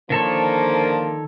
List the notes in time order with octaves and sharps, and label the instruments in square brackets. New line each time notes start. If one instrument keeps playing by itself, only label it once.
[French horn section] D3 F3 A#3 [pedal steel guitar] D#3 A4 C#5